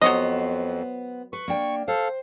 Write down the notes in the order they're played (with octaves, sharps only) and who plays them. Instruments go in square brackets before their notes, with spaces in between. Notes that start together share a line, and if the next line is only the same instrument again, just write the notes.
[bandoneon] F2 [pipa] F#3 C#5 D#5 [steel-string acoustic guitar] B3 C5
[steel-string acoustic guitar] B4 [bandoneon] C#6
[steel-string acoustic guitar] A#3 D4 G5
[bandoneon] A4 F5 [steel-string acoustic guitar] C5